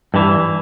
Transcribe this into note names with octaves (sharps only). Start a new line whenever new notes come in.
G2 E3